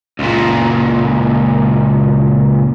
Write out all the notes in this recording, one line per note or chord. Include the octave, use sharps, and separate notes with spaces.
C#2 A#2